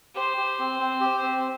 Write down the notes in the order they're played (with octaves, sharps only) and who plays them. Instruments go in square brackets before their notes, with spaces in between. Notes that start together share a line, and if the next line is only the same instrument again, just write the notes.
[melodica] G4 [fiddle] C5
[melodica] G4
C4
C4
G4
C4